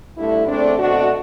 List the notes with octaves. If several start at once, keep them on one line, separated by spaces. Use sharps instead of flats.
G2 D3 A3 E4
E2 D3 A3 C4 D4
B2 A3 C4 D4 F#4